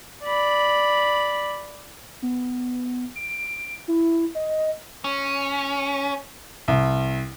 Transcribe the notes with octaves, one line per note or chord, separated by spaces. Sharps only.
D5 B5
B3
D7
E4
D#5
C#4
C2